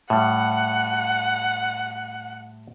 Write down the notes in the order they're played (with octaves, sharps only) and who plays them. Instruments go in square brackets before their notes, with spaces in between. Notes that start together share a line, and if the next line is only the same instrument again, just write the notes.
[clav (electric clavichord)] A2 G3 [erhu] F#5